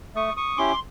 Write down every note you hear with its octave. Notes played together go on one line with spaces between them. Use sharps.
A3 C#6 D#6
C#6 D#6
C#4 E4 G4 C6 D6